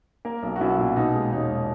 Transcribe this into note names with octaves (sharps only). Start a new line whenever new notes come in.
A#3 A#4
B1
F#4
B1 E4
A#2
B2 D#4
G#3
E1 D#4